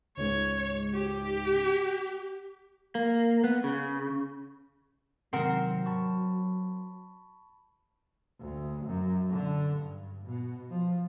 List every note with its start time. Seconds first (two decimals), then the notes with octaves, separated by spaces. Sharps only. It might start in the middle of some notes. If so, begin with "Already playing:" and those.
0.17 C#2 G#2 C#5
0.94 G4
2.95 A#3
3.44 B3
3.64 C#3
5.33 G#2 C3 D#3 F#3 C4 A#4 F#5
5.86 A5 B5 C#6
8.41 D2
8.86 F#2
9.30 D3
9.76 G2
10.27 B2
10.70 F3